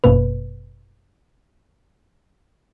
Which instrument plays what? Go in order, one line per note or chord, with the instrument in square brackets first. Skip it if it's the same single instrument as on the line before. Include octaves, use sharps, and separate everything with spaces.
[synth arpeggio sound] G1 F#2 B2 A#3 B4